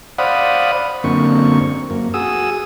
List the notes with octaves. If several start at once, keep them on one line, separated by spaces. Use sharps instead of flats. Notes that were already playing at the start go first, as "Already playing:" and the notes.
C5 D5 F5 F#5 B5 D#6
F#2 D3 A#3 C4 C#6
F#2 A#3
F#4 G#4 D#6 E6